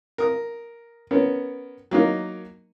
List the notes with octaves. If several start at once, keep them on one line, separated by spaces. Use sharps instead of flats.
A#4 D#6
B3 C#4 A#4
F#3 A#3 D#4 A#4